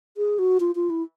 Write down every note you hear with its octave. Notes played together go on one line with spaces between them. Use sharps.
G#4
F#4
F4
F4
E4